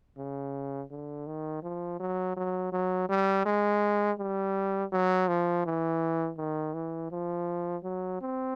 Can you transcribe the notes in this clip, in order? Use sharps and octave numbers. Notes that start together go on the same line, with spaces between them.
C#3
D3
D#3
F3
F#3
F#3
F#3
G3
G#3
G3
F#3
F3
E3
D#3
E3
F3
F#3
C4